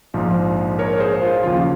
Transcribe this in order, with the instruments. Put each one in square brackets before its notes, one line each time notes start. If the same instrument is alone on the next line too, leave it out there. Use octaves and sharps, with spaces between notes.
[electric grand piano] A#1 G#2 F3
A#4 C#5
G#4 C5
F4
D#2 C#3 F3 F4